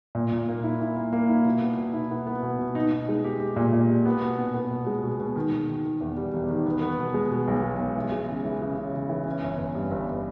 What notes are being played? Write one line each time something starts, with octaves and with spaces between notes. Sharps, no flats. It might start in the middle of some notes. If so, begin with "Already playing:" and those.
A#2
A#2
A#3
E4
E4
A#3
A#3
E4
B2
B3
B2
E4
B3
B3
B2
B2
D#4
D#4
G#3
G4
G4
A#2
A#2
G4
B3
B2
B3
B3
B2
G#3
B2
B2
D#3
D#3
D#3
D#3
E2
G3
E1
D#3
B3
B3
B2
G#3
B2
B1
G#3
B1
E3
G#3
C#3
E3
C#3
C#3
C#3
E3
C#4
G1
G1
G2
G1